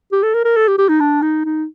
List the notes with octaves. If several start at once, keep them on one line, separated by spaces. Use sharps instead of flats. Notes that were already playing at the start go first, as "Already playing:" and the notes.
G4
A4
A#4
A#4
A4
G4
G4
D#4
D4
D#4
D#4